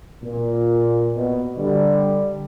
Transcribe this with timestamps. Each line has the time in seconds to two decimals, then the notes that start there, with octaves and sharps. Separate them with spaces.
0.24 A#2
1.16 B2
1.58 D3 G3